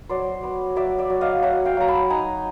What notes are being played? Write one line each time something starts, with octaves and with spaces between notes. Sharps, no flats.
F#3 C5 D5
B3
F#3 D5 E5
D5 E5
F#3
D#5 F5
F#3 E5 F#5
F5 G5
F#3 A#5
A5 B5
D#4 G#5 A#5